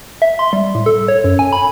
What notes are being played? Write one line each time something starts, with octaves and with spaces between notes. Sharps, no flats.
E5
C6
G3
A2
A4
C#5
F#2
G#5
B5